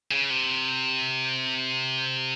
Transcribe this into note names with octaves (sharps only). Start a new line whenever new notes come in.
C#3
C3